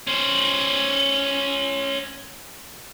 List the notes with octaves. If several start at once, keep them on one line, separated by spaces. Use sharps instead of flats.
C#4 C5